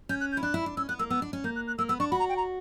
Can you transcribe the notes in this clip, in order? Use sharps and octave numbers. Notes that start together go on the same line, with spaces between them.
C#4 G6
F#6
G6
E4
D4 F#6
E4
D4
C#4 E6
B3 F#6
A#3 E6
B3 E6
D4
C#4
A#3 G6
F#6
F#6
A#3 E6
B3 E6
D4 C#6
F#4 B5
A#5
G5
A#5